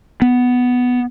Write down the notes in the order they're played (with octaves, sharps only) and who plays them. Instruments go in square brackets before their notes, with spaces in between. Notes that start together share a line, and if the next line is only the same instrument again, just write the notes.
[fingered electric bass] B3